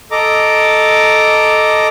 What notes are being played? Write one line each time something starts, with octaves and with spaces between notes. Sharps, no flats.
A4 D#5 A#5 D6